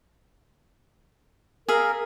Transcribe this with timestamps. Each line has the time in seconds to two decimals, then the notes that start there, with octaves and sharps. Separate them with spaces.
1.68 G#4 A#4 E5 F5